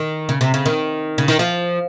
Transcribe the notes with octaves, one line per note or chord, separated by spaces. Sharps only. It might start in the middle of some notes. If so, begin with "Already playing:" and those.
Already playing: D#3
C#3
C3
C#3
D#3
C#3
D#3
F3